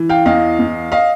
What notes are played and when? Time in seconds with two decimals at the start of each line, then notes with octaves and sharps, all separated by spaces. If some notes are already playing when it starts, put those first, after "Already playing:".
Already playing: E3
0.09 F5 G5
0.26 E2 D#5 F5
0.59 E2
0.92 D#5 F5